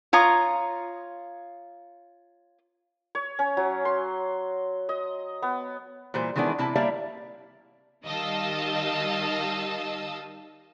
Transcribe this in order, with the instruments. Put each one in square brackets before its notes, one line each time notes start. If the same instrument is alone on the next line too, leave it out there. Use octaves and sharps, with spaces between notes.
[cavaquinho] F4 C#5 A#5 D#6
[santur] C#5
C#4
F#3
C6
D#5
B3
[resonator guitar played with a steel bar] A#2 E3 G3 C5
D#3 E3 G#3 B3 D4 E4
C3 E4 A5
G3 A#3 E4 D5 E5 F5
[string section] D#3 G3 D#5 F5 A5 E6